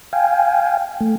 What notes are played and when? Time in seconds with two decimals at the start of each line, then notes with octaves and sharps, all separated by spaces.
0.13 F5 G5 G#5
1.00 A3